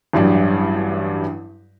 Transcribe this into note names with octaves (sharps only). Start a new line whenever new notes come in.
A1 G2 F#3 G3